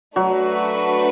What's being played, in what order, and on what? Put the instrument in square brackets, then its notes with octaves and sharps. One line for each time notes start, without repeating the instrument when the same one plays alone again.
[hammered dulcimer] F#3 [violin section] A3 D4 F#4 B4